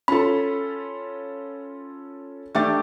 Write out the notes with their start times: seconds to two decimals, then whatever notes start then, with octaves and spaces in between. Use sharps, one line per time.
0.08 C#4 F4 A4 B5
2.55 A3 D4 G4 A6